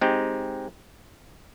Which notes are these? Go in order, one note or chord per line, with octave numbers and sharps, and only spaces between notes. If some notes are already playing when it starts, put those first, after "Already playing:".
G#3 C4 D#4 G4